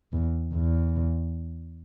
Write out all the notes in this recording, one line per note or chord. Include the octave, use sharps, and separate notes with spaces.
E2
E2